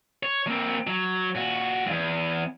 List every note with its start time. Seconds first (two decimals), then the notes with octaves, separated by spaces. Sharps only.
0.23 C#5
0.47 A#3 C4
0.87 F#3
1.35 A#2 F#4
1.86 E2 G2